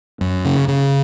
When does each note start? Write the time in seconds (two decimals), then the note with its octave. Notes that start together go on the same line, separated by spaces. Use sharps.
0.21 F#2
0.45 C#3
0.68 C#3